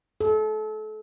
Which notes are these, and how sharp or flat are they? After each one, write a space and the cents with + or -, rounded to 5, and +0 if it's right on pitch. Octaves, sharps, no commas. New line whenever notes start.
A4 -30